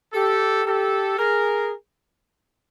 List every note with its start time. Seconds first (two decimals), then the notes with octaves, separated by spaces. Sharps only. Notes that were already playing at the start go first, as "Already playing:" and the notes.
0.13 G4 A4
0.65 G4 A4
1.18 G#4 A#4